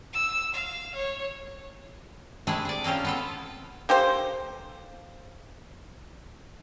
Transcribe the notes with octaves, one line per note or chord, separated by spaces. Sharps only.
E6
F5
C#5
C3 A3 D4 E4 G#4
G#4 D5
A#3 C4 C#4 F4
B3 F4 A4
A#3 G4 A4 C5